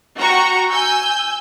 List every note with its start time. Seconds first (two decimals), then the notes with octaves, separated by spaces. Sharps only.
0.17 F#4 G5 A#5 C#6
0.70 G#5 E6 G6